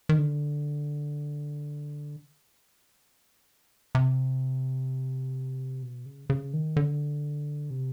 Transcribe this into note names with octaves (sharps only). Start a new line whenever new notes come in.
D#3
D3
C3
B2
C#3
C#3
D#3
D3
C3